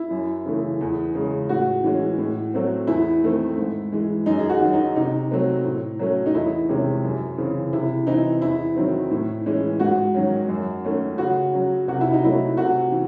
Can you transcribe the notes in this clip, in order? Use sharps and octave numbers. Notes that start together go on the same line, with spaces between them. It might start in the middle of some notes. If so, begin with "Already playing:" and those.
Already playing: E4
F#2
C#3 E3 A3
E2
C#3 G#3
A2 F#4
E3 G#3 C#4
A2
F#3 A3 C4
E2 E4
D#3 A3 C4
G#2
E3 G#3
F#2 D#4
G#4
F#4
D#3 F#3
D#4
C3 D#4
F#3 A3 C4
A2
F#3 A3 C#4
D#4
E2 E4
C3 D#3 G#3 C#4
F#2
C#3 E3 C4
C3 E4
E3 C4 D#4
E2 E4
D#3 F#3 C4
A2
E3 G#3 C#4
G#2 F#4
D#3 F#3 C#4
F#2
D#3 A3 C#4
C#3 F#4
F#3 C#4
C3 F#4
E4
D#4
F#3 A3 E4
C3 F#4
E3